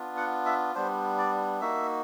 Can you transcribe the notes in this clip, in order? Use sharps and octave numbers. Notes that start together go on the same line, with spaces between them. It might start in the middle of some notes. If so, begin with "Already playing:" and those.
Already playing: B3 D4 F4
F#5
E5
G3 B3 D4 C5
D5
A#3 D#4 F#4 E5